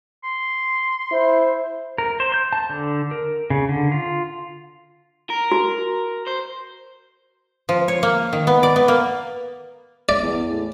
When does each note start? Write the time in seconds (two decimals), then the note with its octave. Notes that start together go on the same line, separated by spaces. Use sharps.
0.24 C6
1.12 E4 C5
1.98 A#4
2.20 C5
2.34 G6
2.53 A5
2.70 D3
3.11 A#4
3.50 C#3
3.69 D3
3.92 F4
5.30 A#4
5.52 F#4
6.27 C5
7.69 F3
7.88 C#5
8.03 A#3
8.33 D#3
8.47 B3
8.63 D5
8.76 B3
8.88 A#3
10.09 D5
10.23 E2
10.51 A2